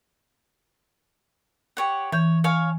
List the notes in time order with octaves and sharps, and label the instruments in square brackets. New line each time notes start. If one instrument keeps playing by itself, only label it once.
[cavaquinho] G4 C#5 F#5
[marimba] E3 G6 [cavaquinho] C#5
[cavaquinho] C#5 F5 G#5